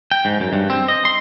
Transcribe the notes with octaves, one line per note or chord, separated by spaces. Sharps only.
G5
G#2
F#2
G2
C4
D#5
C6